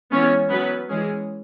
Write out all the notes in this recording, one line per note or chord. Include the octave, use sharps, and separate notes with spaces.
E3 G#3 B3 C#4 C#5
F#3 B3 C#4 B4
E3 G#3 C#4 G#4